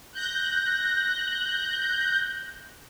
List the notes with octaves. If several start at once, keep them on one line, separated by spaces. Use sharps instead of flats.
F#6 G6 A#6